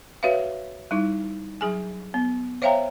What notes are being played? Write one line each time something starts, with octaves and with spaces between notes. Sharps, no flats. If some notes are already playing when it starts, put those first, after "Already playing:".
F#4 B4 C#5 E5 F5
G3 D#4 E4
F#3 G#4 G#5
B3
C5 C#5 E5 F5 G5 A#5